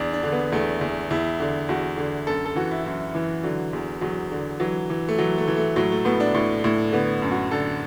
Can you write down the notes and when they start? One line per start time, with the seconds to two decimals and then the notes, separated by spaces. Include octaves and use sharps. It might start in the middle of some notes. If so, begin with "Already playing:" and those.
Already playing: E2 D4
0.13 D4
0.23 D3
0.32 B3
0.52 E2 A3
0.81 E2
1.10 E2 E4
1.40 D3
1.69 E2 F#4
1.98 D3
2.27 F#2 A4
2.45 A4
2.56 E3 F#4
2.71 E4
2.85 F#2 E4
3.15 E3
3.43 D3 F#3
3.73 E2
4.01 E2 F#3
4.31 D3
4.60 E3 F#3
4.90 E3
5.09 A3
5.18 E3 F#3
5.38 A3
5.48 E3
5.57 A3
5.76 A2 F#3
5.92 A3
6.05 A2 B3
6.20 D4
6.34 A2
6.64 A2
6.92 D3 B3
7.22 F#2
7.31 F#4
7.51 D3 A4